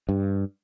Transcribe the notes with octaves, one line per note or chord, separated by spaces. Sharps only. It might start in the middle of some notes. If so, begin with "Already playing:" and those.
G2